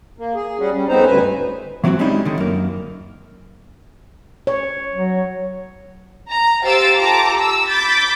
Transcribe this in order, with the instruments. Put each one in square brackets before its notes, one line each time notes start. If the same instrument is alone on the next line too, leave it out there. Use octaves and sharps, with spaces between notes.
[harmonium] A#3
G#4
G3 C#4 F#4 G#4
G3 C#4
F2 B3 C4 D#4 C5 A#5
D2 G2 C#3 B4 G#5
[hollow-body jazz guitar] E3 F#3 C4 D#4 F#4
G3 G#3 C4 C#4 D#4 E4
D3 D#3
F#2 A#3
[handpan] C#5
[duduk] F#3
[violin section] A#5
G4 C5 F5 E6 A6 D7
F4 G4 A4 A5 A#5 D6
E6
B5 D6 G6 A6 B6